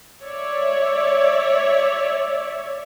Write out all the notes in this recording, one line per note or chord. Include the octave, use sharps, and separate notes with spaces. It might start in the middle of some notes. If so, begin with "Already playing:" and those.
C#5 D5 E5